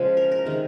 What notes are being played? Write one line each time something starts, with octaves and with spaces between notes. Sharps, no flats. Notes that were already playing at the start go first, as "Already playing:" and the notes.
Already playing: C#3 F3 G#3 C5
A#4
A#4
C3 D#3 G#3